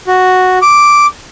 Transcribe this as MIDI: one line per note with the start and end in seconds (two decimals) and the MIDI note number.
0.07 0.58 66
0.62 1.06 86